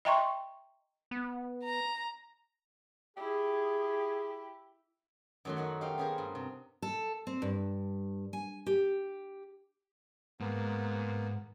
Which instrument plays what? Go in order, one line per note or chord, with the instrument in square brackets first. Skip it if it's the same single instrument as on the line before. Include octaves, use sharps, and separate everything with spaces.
[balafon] D#5 E5 G5 A#5 C6 C#6
[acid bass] B3
[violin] A#5
[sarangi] E4 [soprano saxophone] G4 [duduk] G#4
[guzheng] F#2 D#3 F#3 A3 C6
D#4 F#4 F#5
D#4 G4 C5 F5 G5
B3 C#4 G#4 A#4 C5
G2
C3
[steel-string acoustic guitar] A4
C4
G2
G#5
G4
[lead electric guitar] G#2 [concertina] A#3 B3